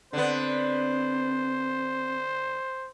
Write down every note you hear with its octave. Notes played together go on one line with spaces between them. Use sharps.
D3 B3 C4 C5